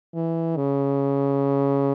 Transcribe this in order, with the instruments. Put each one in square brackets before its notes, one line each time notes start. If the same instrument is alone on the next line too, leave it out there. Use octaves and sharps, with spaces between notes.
[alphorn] E3
C#3